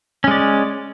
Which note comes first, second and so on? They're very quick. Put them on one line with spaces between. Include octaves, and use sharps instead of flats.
C#4 G#3 D5